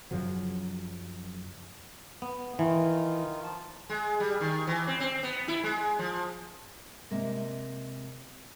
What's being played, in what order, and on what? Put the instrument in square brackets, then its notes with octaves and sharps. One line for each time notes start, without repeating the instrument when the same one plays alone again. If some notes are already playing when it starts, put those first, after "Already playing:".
[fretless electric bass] F#2 C#3 F3 F#3
[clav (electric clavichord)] B3
[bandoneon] D#3 D#4 F4 [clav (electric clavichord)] E3
[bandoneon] F3 A5
[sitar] G#3
G3
D#3
E3
C4
C4
B3
E4
G#3
F3
[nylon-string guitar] C3 G#3 A#3